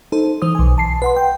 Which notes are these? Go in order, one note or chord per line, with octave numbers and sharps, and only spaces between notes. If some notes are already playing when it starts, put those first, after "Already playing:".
D#4 A4 C5
E3 C5 D#6
B1 G#5
A5 C7
B4 F#5 C6
G5